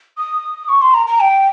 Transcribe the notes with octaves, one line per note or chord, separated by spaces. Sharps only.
D#6
C#6
C6
A#5
A#5
G5